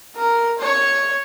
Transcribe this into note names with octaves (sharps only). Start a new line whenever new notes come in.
A#4
C#5